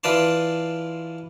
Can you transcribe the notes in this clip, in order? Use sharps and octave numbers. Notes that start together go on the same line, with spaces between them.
E3 F4 B4 D5 A5 C6